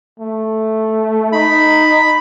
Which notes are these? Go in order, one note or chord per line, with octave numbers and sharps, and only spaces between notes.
A3
D#4 B5